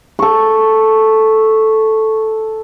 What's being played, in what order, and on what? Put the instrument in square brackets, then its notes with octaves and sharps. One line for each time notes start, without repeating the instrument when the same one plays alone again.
[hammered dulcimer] A4 C#6